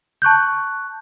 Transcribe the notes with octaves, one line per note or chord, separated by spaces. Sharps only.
A5 C#6 F#6 G6